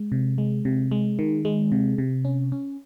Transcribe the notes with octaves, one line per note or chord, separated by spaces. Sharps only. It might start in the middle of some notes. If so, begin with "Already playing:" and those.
Already playing: G#3
C3
G#3
C3
G#3
D#3
G#3
C3
C3
C#4
C#4